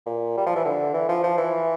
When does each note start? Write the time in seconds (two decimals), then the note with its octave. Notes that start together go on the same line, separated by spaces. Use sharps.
0.06 A#2
0.37 G3
0.47 F3
0.56 E3
0.65 D3
0.94 E3
1.09 F3
1.23 F3
1.38 E3